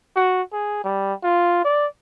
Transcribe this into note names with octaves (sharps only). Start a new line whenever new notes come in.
F#4
G#4
G3
F4
D5